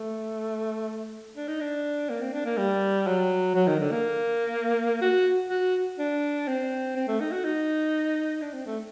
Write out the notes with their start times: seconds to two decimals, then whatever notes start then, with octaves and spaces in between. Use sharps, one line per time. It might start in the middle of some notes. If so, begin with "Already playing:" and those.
Already playing: A3
1.37 D4
1.48 D#4
1.61 D4
2.10 A#3
2.21 C4
2.33 D4
2.45 A#3
2.57 G3
3.07 F#3
3.55 F#3
3.67 D#3
3.80 D3
3.91 A#3
5.02 F#4
5.49 F#4
5.99 D4
6.48 C4
6.96 C4
7.08 A3
7.20 D#4
7.32 F#4
7.44 D#4
8.42 D4
8.53 C4
8.66 A3